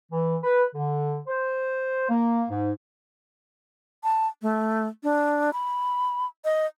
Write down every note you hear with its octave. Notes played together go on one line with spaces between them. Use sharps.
E3
B4
D3
C5
A#3
G#2
A5
A3
D4
B5
D#5